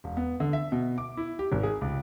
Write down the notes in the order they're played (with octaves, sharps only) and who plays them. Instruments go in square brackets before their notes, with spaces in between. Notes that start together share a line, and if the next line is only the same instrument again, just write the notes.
[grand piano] E1
B3
D3
E5
B2
D6
E4
G4
G#1
G#4
C#2